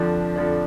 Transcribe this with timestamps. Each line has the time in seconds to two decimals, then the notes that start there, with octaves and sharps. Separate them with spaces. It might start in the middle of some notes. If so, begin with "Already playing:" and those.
Already playing: F2 D3 F3 D4
0.36 F2 D3 F3 D4